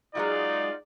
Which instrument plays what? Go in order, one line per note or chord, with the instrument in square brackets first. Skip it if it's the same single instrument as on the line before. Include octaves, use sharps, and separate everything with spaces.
[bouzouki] F#3 G#3 F#4 [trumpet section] D#4 F4 [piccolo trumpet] D5